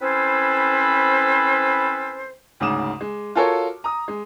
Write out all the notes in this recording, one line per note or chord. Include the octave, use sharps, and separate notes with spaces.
C4 C#4 E4 A4 B4 C5
D2 G#2 C#3 D6 D#6 E7
G#3
F4 F#4 A4 A#4 C#5
A#5 D#6
G#3